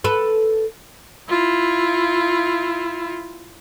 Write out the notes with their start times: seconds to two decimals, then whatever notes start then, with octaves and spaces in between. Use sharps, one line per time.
0.04 A4 B4
1.29 E4 F4